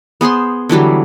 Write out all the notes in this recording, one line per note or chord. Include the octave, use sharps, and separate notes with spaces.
B3 G#4 C5 C6
D3 E3 F#3 G3